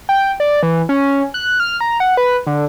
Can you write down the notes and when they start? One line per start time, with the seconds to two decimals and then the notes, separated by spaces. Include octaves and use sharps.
0.09 G5
0.40 D5
0.63 E3
0.89 C#4
1.34 F#6
1.60 F6
1.81 A#5
2.00 F#5
2.17 B4
2.47 D3